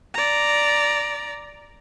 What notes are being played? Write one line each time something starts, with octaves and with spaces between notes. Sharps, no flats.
D5 A#5